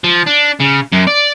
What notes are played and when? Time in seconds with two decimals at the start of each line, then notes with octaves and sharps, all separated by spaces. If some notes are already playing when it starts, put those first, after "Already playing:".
0.04 F3
0.27 D4
0.60 C#3
0.92 F#2
1.07 D5